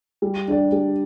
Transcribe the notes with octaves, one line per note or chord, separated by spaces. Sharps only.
G3
D4 G4 D5
G3